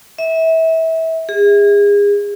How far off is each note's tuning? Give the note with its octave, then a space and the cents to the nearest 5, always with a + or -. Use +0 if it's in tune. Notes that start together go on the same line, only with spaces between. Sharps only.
E5 -25
G#4 -35